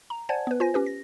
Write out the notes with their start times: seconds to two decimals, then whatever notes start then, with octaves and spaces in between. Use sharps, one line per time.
0.10 A#5
0.29 C5 D5 F#5 G#5 A5 G#6
0.47 B3 B4
0.60 F4 C5 G#5 A#6
0.74 C#4 G4 B4
0.86 A#6